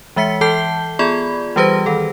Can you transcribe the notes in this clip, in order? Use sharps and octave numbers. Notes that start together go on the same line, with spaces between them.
E3 G#3 E5 B6 C#7
E3 A4 A5 G6 C7 G7
B3 F4 G#4 D5 B5 G#6
E3 G3 G4 B4 C5 A#6
D#3 A4